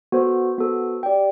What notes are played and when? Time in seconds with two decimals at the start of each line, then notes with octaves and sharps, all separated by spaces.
0.12 B3 F#4 A4 C5
0.58 B3 F#4 A4 C5
1.03 G4 D5 G5